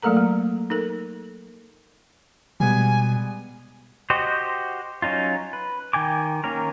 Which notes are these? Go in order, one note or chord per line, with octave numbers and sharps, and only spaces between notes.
F#3 A3 A#3 A4 A#4 A#5
A#3
D#4 A4 A#4
B2 G3 G#3 B3 G#5
F#4 G4 C5 D#5
F#3 C#4 D#4 F4
B4
D#3 G5 G#5 D6
D#3 A#3 C#4 A#4